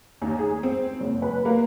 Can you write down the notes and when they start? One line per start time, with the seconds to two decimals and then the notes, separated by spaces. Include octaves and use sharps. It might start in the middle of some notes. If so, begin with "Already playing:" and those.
0.22 D#2
0.39 G#4
0.63 C4
1.00 F#1
1.22 B4
1.45 A#3